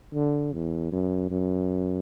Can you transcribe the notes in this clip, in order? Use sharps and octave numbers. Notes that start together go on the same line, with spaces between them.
D3
E2
F#2
F#2